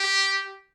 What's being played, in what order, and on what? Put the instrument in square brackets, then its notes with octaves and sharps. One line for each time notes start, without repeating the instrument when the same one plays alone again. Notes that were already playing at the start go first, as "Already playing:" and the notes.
Already playing: [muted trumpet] G4